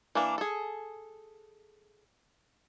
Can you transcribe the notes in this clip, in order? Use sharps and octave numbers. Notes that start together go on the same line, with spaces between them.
E3 A#3 D4
G#4 A4